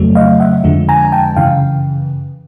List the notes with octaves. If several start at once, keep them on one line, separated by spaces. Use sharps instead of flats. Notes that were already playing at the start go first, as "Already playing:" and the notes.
Already playing: F2 C#3 F#3 A3
D#5 F5
E5 F#5
F2 D3 F3 G#3
G#5 A#5
G5 A5
F#2 C#3 E3 F5 G5